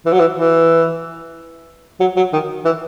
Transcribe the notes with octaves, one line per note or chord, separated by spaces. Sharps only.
E3
F#3
E3
E3
F#3
F#3
D#3
E3